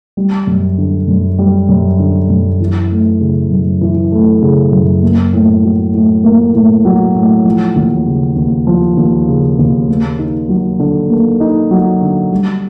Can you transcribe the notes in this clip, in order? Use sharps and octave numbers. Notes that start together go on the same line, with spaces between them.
G3
F#2
D3
F#2
G3
F#2
D3
F#2
E3
A3
C#3
F#2
E3
A3
C#3
F#2
A#3
A2
F#3
A2
A#3
A2
F#3
A2
F3
D#2
C#3
D#2
F3
D#2
C#3
D#2
A#3
D#4
F#3
D3
A#3
D#4
F#3
D3
G3